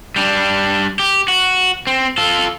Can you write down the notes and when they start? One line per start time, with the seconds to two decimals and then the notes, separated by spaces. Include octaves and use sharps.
0.16 G3 D4
0.99 G4
1.28 F#4
1.87 C4
2.18 F4 A4